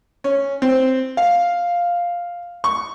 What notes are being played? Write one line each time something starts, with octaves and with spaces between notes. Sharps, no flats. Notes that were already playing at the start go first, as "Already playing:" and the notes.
C#4
C4
F5
C#6